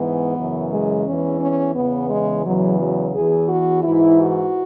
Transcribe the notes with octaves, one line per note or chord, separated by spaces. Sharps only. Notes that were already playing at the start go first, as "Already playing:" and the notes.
Already playing: G#2 E3 B3
F#2 C#3 E3
G#3
E2 E3 C#4
C#4
E2 C#3 E3 B3
G#3
E2 C#3 E3 F#3
F#3
E2 E3 G#4
F#4
G#2 E3 E4
F#4